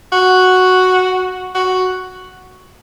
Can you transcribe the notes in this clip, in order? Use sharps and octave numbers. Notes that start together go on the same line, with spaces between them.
F#4
F#4